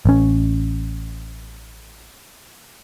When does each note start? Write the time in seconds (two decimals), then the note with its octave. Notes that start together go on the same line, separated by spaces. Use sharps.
0.05 A1 C#4